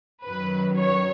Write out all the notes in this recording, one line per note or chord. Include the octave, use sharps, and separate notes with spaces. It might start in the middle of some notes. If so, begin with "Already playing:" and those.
F#2 D#3 F#3 B4
C#5